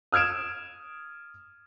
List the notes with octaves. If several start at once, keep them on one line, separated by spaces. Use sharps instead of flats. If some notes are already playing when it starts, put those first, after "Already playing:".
D#6 F6 G#6 D7 E7